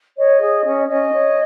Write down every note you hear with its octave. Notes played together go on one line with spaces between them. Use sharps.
C#5 D#5
G#4
C#4
C#4 D#5
C#5